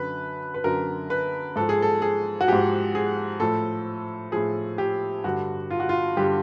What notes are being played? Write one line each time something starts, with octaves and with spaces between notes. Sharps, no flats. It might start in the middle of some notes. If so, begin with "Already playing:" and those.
Already playing: F#2 D3 F#3 B4
B4
F#2 D3 F#3 A#4
B4
G#2 F3 A4
G#4
A4
G#4
F#4
G#2 F3 G4
G#4
A2 F3 A4
A2 F3 G#4
G4
G2 D3 G3 F#4
F4
F#4
F4
G2 D3 G3 G4